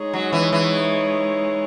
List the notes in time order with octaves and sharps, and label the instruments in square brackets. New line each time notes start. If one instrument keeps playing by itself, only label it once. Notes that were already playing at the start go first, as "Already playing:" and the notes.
Already playing: [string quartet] G#3 D#4 G#4 C#5
[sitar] F#3
E3
E3